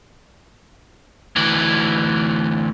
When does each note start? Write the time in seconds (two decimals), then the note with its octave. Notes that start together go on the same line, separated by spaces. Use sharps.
1.36 D2 E3